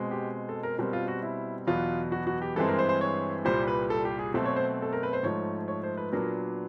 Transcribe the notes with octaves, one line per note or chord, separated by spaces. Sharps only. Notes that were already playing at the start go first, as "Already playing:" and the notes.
Already playing: B2 G#3 C4
G4
A4
A#4
B2 G3 C4 A#4
F4
F#4
E4
E2 B2 F#3 B3 F4
F#4
F#4
G4
G2 E3 G#3 C4 A4
A#4
C5
C5
C#5
C2 A#2 G3 C5
B4
A4
G4
G#4
B2 F#3 A3 C4 A4
C#5
C5
A4
A#4
B4
C5
G#2 F3 A3 C#5
C#5
C5
B4
A#2 F#3 B3 D4 A#4